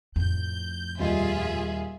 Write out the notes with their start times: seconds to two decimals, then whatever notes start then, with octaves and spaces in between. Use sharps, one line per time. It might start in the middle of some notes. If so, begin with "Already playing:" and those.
0.16 F2 A2 G6
0.99 D#1 G3 F4 G#4 D#5 E5